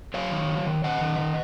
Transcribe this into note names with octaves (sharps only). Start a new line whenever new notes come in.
F#3 C#5 F5
D#3
F#3
D#3
D#3 D#5 F#5
D#3
D#3